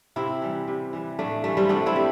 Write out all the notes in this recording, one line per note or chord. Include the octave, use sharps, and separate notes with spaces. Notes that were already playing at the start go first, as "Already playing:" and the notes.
C3 C4 E4
E3 G3
C3
E3 G3
A2 A3 D4
E3 G3 A3
G3 C4
C3 A3 D4
C4 E4
G3